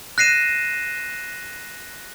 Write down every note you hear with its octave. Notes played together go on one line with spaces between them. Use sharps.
F#6 A#6 C7 D#7 E7